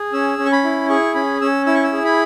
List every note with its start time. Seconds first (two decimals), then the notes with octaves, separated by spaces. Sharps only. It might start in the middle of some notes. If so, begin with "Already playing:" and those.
Already playing: G#4
0.13 C#4 E6
0.38 C#4
0.46 C#6
0.52 B5
0.64 E4
0.90 G#4 C#6
1.15 C#4 B5
1.41 C#4 E6
1.66 E4 E6
1.75 C#6
1.84 E6
1.93 G#4
2.05 B5